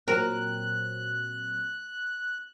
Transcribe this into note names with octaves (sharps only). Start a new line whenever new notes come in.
A#2 F#3 C4 A#4 F#6